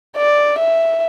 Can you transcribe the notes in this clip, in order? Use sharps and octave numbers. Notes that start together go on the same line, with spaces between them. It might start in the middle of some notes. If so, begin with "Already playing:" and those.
D5
E5